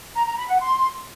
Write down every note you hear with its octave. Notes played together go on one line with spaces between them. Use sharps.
A#5
A#5
B5
F#5
C6